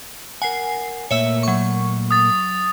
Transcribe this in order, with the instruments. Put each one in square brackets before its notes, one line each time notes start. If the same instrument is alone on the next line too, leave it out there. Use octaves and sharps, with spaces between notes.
[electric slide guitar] A#4 F#5 [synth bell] G#5 C7
[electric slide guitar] A#2 A3 A#3 [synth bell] C#5 E5 E6
[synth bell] F#3 C#6
[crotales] D#6 A6